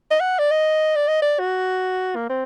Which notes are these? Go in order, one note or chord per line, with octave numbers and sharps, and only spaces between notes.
D#5
F#5
D5
D#5
D5
D#5
D5
F#4
A#3
C4